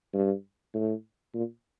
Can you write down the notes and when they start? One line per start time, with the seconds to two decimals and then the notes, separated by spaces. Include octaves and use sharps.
0.14 G2
0.74 A2
1.34 A#2